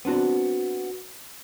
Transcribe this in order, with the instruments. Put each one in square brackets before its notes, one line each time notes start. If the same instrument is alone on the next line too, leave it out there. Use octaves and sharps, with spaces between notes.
[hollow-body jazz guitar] B3 C4 D4 F#4